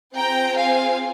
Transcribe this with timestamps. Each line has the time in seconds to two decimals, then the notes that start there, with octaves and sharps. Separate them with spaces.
0.16 C4 F4 G#4 G5 A#5
0.57 F5 G#5